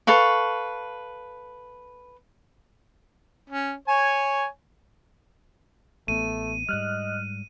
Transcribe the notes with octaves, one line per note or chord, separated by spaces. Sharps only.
A4 B4 F5 C#6
C#4
C#5 G#5
A1 A3 B3 D#7
G#2 G3 D#5 F6 F#6